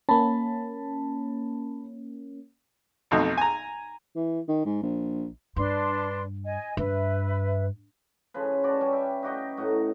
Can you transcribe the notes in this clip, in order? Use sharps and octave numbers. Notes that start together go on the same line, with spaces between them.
A#3 C#4 A5 B5
B1 F2 B2 A3 D#4
G#5 A#5
E3
D#3
G#2
A#1
G2 D4 B4 C6
D#5 G#5
G2 B4 E5
C#3 F3 B4
F#4 D5 A5
G3 C#4
E5 G5
D#4 F#4 G4 D#5
A2 F#4 D#5 A#5